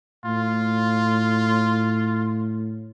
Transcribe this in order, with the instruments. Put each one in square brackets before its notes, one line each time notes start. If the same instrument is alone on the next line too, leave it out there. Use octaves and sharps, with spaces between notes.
[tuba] A2 [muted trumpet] F4